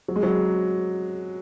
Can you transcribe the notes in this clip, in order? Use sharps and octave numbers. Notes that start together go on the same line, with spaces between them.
F#3
G#3
F#3